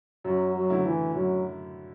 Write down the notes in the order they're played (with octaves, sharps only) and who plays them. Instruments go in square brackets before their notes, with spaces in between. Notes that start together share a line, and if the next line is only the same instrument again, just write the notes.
[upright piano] F#2 [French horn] F#3
[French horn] F#3
[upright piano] D3 A3 E4
[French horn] E3
[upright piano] F#2 [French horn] F#3